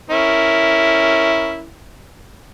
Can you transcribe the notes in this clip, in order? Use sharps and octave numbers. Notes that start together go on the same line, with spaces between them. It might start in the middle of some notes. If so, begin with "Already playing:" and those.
C#4 E4 A#4